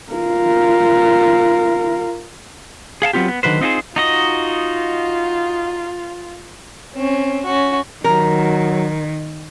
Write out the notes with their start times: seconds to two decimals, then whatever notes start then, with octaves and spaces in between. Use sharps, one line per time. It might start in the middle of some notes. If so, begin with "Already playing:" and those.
0.13 F4 A#4
3.02 G#4 F5 F#5 A5
3.13 F#3 B3 C4 F4 G4
3.28 B3
3.43 D3 D#3 F#3 B4 C5
3.61 C4 D#4 F4 G4 G#4 C5
3.96 D#4 F4 F#4 D#5
6.96 C4 C#4
7.44 C#4 F#4
8.04 D#3 F#3 A#4